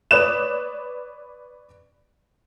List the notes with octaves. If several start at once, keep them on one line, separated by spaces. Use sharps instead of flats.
B4 C#5 D5 D#6 F#6 E7